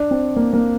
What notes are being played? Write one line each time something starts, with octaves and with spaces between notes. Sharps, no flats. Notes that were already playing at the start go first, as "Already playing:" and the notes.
Already playing: D4
C4
A#3
A#3